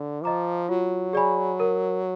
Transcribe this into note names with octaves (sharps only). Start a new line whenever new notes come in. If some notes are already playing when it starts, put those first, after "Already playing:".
Already playing: D3
F3 D#5 A#5 D6
F#3 F4
G#4 D5 G#5 B5
A#4